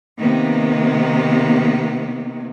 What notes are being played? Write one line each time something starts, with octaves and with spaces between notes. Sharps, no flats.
C3 D#3 A#3 B3